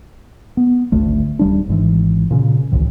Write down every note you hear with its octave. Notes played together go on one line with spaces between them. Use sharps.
B3
G#1 D2 A3
D#1 G3 D4
G#1 G#2 E3
A#2 C#3
G#1 C#2 A2 E3